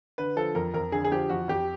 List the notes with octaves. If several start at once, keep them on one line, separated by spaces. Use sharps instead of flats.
D3 B4
F3 A4
F2 A#4
F2 A#4
D3 G#4
G#4
F3 G4
F2 F#4
F2 G4